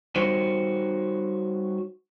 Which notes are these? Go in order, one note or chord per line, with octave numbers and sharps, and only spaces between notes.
G3 D#4 F#4 C5 C#5